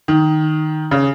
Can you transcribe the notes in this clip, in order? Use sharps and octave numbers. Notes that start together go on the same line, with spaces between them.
D#3
C#3